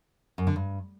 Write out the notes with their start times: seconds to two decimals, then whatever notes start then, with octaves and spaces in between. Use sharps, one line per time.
0.38 F#2
0.47 D3
0.56 G2